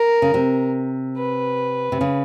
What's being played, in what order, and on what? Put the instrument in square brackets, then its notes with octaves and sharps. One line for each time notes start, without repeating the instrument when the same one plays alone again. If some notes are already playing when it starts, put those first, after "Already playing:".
Already playing: [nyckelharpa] A#4
[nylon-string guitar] C#3
C3
[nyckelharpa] B4
[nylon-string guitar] C3
C#3